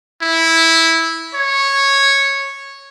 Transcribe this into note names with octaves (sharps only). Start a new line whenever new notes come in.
E4
C#5